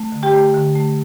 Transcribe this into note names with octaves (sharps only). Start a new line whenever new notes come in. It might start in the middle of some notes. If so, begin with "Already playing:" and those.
Already playing: A3
D3
G4 G5
A3
D3
A3